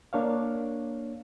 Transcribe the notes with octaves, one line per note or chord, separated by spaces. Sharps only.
A#3 D4 C#5 F5